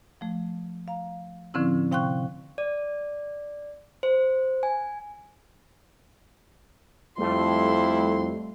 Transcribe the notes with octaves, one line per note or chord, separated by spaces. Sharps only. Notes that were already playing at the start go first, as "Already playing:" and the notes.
F3 A3
F5 A#5
A2 D3 F3 C4 C#4 E4
C3 F5 G5 C6 C#6 F#6
D5
C5
G#5
F2 G3 A3 E4 C6